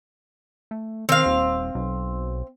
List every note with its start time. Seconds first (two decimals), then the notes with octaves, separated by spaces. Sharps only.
0.71 A3
1.09 D#3 C4 F5
1.26 D#1
1.75 B1